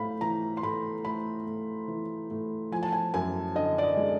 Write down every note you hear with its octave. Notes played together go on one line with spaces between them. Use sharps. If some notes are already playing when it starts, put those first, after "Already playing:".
Already playing: A2 A3 F5 B5
E3 A#5
C6
A2 B5
A3 B5
A2
E3
A2
F3 G#5
A5
G#5
F#2 G#5
D3 D#5
D5
D#5
G#3